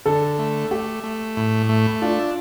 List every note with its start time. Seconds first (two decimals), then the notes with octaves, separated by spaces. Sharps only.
0.06 D3 A4
0.39 A3
0.71 A3 G4
1.04 A3
1.37 A2
1.69 A3
2.02 D4 F4